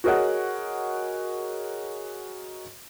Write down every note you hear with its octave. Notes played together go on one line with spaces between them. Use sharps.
F#4 G#4 A#4 C#5 D#5 F#5